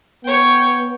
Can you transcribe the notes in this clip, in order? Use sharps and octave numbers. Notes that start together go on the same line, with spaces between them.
B3 C#5 G5